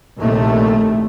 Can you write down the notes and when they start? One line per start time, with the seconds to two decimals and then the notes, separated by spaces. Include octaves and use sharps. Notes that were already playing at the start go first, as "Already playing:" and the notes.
0.18 A#1 D#2 A2 C3 A3